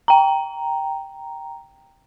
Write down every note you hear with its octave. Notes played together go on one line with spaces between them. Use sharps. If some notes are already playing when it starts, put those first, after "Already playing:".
G5 A#5